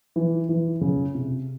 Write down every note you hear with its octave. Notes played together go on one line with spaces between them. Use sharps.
E3
E3
C#3
C3